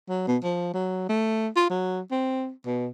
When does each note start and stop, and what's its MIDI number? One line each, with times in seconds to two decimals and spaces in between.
0.09 0.25 54
0.28 0.37 47
0.43 0.73 53
0.74 1.08 54
1.09 1.48 57
1.56 1.70 65
1.70 2.01 54
2.11 2.51 60
2.66 2.88 47